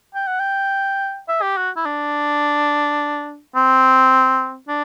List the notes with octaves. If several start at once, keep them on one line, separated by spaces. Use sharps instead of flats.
G5
F#5
G5
E5
G4
F#4
E4
D4
C4
D4